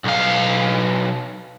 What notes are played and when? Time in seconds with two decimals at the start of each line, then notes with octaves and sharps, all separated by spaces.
0.04 B1 F5